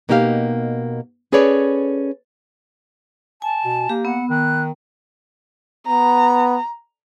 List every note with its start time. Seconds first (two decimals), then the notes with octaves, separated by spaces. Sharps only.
0.09 B2 A#3 D#4 G4 D#5 F5
1.32 C#4 G#4 A4 B4 C#5 D5
3.42 G#5 A5
3.65 B2
3.90 A#3 G4
4.05 B3 F#5
4.30 D#3 F#6
5.87 B3 A#5